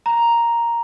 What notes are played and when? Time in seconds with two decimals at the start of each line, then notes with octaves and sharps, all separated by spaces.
0.06 A#5